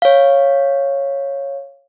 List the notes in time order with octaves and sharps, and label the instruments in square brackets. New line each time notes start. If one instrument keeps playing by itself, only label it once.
[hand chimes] C#5 F5